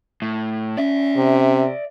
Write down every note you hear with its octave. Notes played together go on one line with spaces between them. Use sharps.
A2
C#4 D5 E5
C3